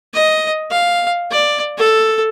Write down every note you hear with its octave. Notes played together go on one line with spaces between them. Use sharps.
D#5
F5
D5
A4